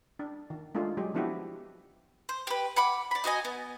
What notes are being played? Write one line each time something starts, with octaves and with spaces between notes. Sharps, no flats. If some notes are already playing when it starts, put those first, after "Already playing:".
D4
D#3
G#3 A3 D4 F4
F#3 G#3 G4
F3 B3 D4 E4 F#4 G4
C5
G4 B4
F#5 B5 D6
D5 B5
D#4 F#4 D#5 G#5
B3